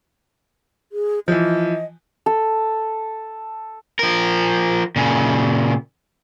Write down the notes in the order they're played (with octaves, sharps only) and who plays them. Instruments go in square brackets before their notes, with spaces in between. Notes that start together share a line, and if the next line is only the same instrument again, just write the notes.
[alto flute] G#4
[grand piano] E3 F3 [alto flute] D#5
[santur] A4
[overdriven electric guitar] F3 A#4
A#2 C#3